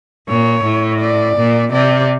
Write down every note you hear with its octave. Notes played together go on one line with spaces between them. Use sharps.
A#2 C#5
A2
D5
A#2
C3 D5